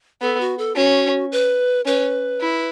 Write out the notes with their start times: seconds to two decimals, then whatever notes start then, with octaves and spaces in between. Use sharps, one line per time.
0.22 B3 A4
0.41 F#4
0.58 A4
0.76 C#4 F#4
1.32 B4
1.86 C#4 B4
2.41 E4